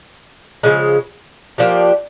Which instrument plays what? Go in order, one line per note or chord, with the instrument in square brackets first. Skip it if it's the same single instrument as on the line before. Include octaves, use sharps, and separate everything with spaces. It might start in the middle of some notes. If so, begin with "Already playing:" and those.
[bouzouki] C#3 F3 G#3
F3 A#3 D4 G4